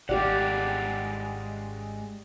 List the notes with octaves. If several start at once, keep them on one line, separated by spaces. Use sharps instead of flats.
G#1 G#3 G4 D5 F5 F#5